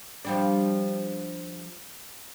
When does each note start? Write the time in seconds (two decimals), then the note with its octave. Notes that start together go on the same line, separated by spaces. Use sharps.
0.25 F3 G3 D4